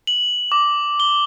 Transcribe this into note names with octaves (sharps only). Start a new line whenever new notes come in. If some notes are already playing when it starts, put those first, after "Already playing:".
F#7
D6
G7